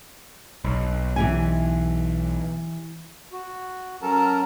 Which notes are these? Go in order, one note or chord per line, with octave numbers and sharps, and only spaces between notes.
B1
E3 G4 G#5
F#4
F#3 C#4 A4 A#4 A5 A#5